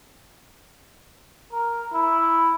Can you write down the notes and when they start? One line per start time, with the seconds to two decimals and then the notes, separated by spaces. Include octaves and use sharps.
1.52 A#4
1.93 E4